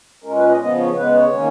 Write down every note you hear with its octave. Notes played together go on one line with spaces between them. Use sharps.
A#2 G#3 C#4 A#4
B4
D#5
C#3 F3 B3 D#5
C#5
C#3 G#3 B3 B4
C#5
D#3 A#3 C#4